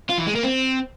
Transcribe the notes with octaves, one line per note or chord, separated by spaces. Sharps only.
F4
E3
G#3
A#3
C4